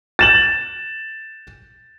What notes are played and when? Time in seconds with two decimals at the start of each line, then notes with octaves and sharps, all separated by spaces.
0.19 A6 E7 F#7